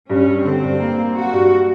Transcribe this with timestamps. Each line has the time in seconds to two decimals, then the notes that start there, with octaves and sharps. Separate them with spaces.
0.09 G2 C#4
0.27 G2
0.44 D3 C4
0.62 G2
0.80 A#3
0.97 A#3
1.15 F#3 F#4
1.32 G2
1.50 F#3